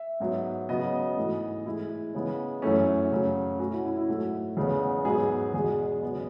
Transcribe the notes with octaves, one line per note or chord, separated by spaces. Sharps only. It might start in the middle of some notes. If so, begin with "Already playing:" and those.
Already playing: E5
G#2 F#3 B3
C#3 F#3 B3 D#5
G#2 E3 A3
A2 E3 G#3 E4
C#3 E3 G#3 B3
F#2 E3 A3 C#4
F#2 C#3 F#3 A3 C#4
B2 A3 C#4 F#4
E4
E4
E4
G#2 F#3 A3 F#4
E2 C#3 G#3 B3
G#2 F#3 B3 G#4
E2 B2 G#3 G#4
C#3 F#3 B3